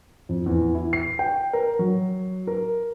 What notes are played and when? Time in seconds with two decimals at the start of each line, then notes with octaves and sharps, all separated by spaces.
0.29 F2
0.46 E2
0.75 E4
0.93 C7
1.19 G5
1.53 A#4
1.79 F#3
2.47 A#4